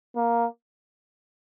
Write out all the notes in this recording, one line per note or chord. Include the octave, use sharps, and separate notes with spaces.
A#3